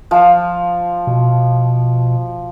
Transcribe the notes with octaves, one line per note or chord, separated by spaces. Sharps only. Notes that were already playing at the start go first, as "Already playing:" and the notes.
F3
B2